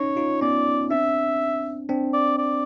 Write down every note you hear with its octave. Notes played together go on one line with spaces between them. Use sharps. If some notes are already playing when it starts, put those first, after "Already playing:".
Already playing: C#4 D#4 C#5
D#4 F4
B3 C#4 D5
C4 D4 E5
C4 D4
D5
D5